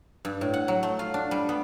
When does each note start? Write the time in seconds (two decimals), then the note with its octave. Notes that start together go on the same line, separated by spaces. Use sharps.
0.25 G2
0.41 A2
0.54 F#5
0.68 F#3
0.83 A3
0.99 F4
1.14 D4
1.31 G3
1.49 B3